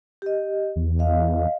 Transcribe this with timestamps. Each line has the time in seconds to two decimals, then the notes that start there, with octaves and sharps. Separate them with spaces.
0.22 G4 D#5
0.76 E2
0.99 D#5 F5